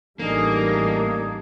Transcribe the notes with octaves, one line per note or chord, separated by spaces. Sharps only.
A1 G3 A#3 D4 D#4 G#4 A4